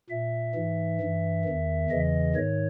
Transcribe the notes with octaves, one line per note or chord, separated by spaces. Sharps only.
A#2 E5
G#2 E3
G2 E3
E2 D#3
E2 C#3 E3 D#5
G#2 D#3 C#5